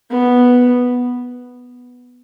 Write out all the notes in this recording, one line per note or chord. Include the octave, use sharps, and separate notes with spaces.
B3